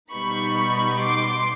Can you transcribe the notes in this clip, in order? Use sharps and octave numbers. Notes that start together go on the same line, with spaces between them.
B2 G3 B3 D#4 B5 C#6
C6 D6